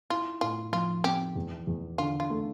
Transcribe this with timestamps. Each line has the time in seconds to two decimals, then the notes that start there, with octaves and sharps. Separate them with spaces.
0.10 E4 F4
0.41 A2 F4
0.72 F3 F4
1.04 C4 G4
1.35 E2
1.67 E2
1.98 D3 F4
2.20 F4
2.30 A3